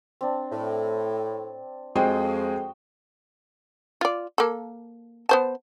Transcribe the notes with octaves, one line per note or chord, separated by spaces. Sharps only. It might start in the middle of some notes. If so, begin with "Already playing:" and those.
C4 D4
A2
F2 G#3 C4 F#4 G#4 D#5 G5
F4 D5
A#3 A4
B3 C5 A5